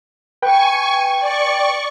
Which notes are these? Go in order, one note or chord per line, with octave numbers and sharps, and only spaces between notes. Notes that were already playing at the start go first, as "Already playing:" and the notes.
B4 G5 G#5 C#6
D5 C#6